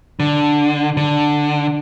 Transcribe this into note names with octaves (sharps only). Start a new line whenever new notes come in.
D3
D3